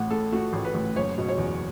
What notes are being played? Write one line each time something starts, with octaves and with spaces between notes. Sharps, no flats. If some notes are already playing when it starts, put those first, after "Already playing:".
Already playing: A1 A2 F#5
A2 A4
A3 F#4
A1
B4
A1
F#1 C#5
B2
C#5
E2